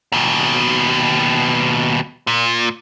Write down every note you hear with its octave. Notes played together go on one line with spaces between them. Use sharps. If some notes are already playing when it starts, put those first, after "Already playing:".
D#2 B2
A#2